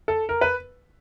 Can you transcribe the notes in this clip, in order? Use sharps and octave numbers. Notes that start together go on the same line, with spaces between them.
A4
A#4
B4